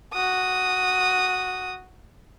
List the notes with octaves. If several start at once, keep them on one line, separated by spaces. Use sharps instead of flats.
F#4 D#6